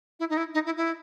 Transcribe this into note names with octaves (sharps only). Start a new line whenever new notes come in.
E4
D#4
E4
D#4
E4
E4